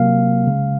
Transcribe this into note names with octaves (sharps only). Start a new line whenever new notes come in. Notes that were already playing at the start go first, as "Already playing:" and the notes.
Already playing: C3 F#3 A#3 F5
C#3 G#3